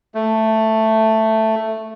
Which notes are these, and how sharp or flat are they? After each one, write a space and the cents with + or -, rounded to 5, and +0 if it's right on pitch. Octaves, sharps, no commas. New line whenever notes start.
A3 +5